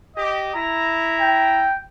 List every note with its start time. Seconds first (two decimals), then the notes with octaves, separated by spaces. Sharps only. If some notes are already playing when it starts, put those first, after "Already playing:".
0.16 G4 D#5
0.54 E4 A#5
1.21 G5